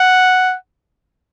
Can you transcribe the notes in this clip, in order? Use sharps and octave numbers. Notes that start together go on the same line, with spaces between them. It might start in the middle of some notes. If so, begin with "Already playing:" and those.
Already playing: F#5